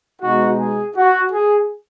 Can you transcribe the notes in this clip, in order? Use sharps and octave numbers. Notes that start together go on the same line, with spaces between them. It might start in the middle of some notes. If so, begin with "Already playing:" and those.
B2 G#3 D#4 F#4
G#4
F#4
G#4